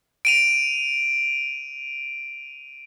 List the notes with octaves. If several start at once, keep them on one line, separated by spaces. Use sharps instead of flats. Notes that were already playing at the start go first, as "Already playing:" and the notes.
D7 D#7 F7